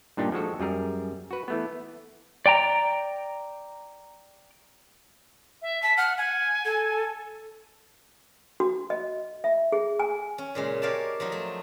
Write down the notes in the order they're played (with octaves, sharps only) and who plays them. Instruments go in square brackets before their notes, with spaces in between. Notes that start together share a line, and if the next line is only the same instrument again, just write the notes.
[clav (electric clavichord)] G2 A#2 D4 D#4 G4
F3 G#3 F#4 A4
F#2 G3 G#4 A#4
F#4 B4
E3 A3 B3
[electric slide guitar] D5 G5 G#5 A#5
[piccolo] E5
[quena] A5 [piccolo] B6
[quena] F#5 [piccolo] F6
[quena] F#5 [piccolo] G#5
[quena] A4
[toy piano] F#4
D#5
E5
G#4
G#5
[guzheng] C#4
A#2 C#3 G#3
G4 A#4 C#5 D5 F5 A5
F3 F#3 D#4
A3